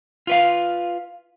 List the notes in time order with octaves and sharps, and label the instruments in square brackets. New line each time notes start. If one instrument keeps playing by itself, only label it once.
[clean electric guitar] F4 B4 F5